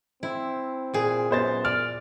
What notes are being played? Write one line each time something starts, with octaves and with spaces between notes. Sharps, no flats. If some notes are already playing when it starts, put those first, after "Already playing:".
C4 E4
A#2 G#4
F#2 B3 C5 A6
D5 F6